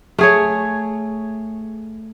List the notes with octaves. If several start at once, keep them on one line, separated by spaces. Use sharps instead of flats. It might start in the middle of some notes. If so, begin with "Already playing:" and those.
A3 G#4 C#5